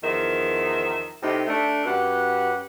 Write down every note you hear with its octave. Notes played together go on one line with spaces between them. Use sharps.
E2 D#3 F3 E5
A2 C3 D#4 G4
A3 D4
F#2 G4 B4 F#5